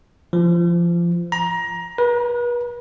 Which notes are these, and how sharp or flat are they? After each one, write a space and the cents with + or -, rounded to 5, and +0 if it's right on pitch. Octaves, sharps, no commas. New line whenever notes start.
F3 -25
A#5 +20
B4 -40